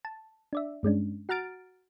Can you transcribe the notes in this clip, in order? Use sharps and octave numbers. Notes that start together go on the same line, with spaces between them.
A5
D4 D5 E5
G2 G#3 C#4 D4
F#4 F#5 A#5 F6 A6 D7